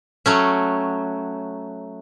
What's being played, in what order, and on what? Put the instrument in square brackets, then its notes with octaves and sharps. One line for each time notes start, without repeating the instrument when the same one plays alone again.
[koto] F#3 A3 C#4